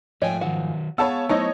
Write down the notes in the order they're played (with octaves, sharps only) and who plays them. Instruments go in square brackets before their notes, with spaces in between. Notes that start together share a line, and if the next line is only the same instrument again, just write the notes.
[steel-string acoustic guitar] G#2 F3 G#5 [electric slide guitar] A3 G5 [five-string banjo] C#5 D#5
[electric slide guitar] D#3 F#3 [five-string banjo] F#5
[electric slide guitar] B3 [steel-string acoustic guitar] G#4 F5 [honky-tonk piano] C#5 A5 E6 [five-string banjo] F#5 B5
[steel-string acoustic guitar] F#3 E4 C5 [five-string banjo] A3 D#4 [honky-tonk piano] C#5 D#5